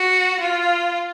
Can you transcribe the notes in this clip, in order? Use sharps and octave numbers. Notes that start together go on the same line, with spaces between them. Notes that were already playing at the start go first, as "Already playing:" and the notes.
Already playing: F#4
F4